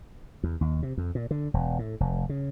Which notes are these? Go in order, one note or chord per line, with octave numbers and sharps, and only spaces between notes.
E2
D#2
C3
F2
A#2
D3
E1
A2
F1
C#3